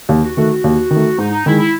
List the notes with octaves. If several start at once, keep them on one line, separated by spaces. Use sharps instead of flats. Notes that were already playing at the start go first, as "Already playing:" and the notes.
D#2
F#4
D#3 A3 F#4
F#4
D#2
D#3
A3
G#2 D#4
D#4
D#3 G#3 E4
E4